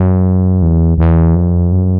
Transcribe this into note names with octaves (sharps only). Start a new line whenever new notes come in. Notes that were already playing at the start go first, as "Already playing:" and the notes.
Already playing: F#2
E2
E2
F2
F#2